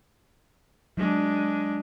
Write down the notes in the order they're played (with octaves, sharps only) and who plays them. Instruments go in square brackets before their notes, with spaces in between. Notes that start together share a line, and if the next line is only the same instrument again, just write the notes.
[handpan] F#3 [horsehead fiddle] G#3 D4